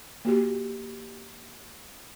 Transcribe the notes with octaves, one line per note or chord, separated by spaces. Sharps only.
A#3 F#4 G4